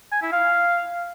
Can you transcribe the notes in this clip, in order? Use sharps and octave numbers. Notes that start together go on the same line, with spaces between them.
G#5
E4
F5